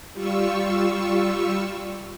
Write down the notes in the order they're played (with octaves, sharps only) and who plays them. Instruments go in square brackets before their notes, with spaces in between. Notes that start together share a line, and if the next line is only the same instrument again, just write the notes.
[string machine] G3 F4 C#6 E6